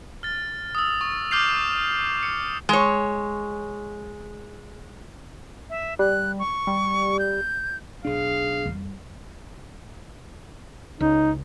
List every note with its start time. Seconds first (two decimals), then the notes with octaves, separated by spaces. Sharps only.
0.23 F6 A6
0.75 D#6 E6
1.01 C#6
1.31 D6 E6 F6 G6 C7 F7
2.23 C#7
2.69 G#3 C#5
5.70 E5
5.99 G3 F#6
6.39 C#6
6.67 G3
7.19 G6
8.05 B1 D4 G#4 F5
8.66 F2 G3
11.00 C#2 D#4